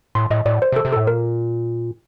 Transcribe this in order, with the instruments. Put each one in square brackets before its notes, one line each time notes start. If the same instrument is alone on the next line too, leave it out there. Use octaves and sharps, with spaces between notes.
[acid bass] A2 [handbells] C6
[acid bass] A2 [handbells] D#5
[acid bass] A2 [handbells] D5
[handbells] C5
[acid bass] C3
[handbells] A4
[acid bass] C3
[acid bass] A2 [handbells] A4
[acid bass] A#2 [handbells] A#4